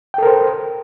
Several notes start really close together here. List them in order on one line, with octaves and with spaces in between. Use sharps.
G5 A4 A#4 C5